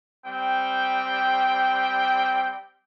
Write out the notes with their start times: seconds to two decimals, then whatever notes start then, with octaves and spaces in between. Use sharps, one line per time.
0.25 G3 C4 G5